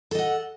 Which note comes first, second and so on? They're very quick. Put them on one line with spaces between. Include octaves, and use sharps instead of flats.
A4 D#5 F#5